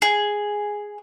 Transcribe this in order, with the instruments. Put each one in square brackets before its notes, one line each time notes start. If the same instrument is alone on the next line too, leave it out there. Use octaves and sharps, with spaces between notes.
[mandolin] G#4